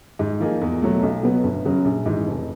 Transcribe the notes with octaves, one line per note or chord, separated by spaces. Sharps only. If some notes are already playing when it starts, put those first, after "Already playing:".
G#2
F3 A#3 D#4 G#4
E2
B2 F#3 A3
B1
B2 F#3 B3
G1
F#2 C#3 F#3
A#1
G#2 E3
F1